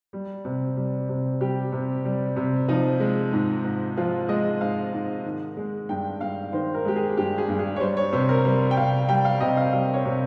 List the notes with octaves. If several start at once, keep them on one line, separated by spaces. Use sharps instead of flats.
G3
C3
G3
C3
G3 G4
C3
G3
C3
F3 D#4
G#3
G#2
G#2
F3 F4
G#3 D#5
G#2 F5
G#2
D#3
G#3
G2 G5
G2 F5
D#3 C5
A#4
G#3 G4
G#4
G2 G4
G#4
G2
G#4
C#5
G3 C5
C#5
C3 C5
A#4
G3 C5
G5
C3 F5
G3 G5
F5
C3 D#5
F5
G3 F5
C#5
C3